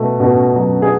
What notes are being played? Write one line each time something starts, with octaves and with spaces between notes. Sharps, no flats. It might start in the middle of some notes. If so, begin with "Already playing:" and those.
Already playing: B2 A3
B2
F#3
G#4